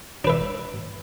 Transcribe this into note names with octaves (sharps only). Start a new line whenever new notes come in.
D4 B4 E5